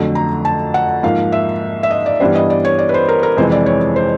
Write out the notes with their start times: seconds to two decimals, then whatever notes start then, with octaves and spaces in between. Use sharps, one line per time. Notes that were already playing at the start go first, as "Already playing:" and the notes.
Already playing: F2 D3 F#3 A3
0.15 A#5
0.45 A5
0.74 F#5
1.03 G#2 F3 A#3 F5
1.32 E5
1.83 E5
1.91 D#5
2.06 D5
2.20 G2 E3 G3 B3 D4 C5
2.35 D#5
2.50 D5
2.65 C#5
2.79 D5
2.89 B4
2.94 C5
3.08 A#4
3.23 A#4
3.37 F2 C3 E3 G#3 C5
3.52 D5
3.66 C#5
3.96 C5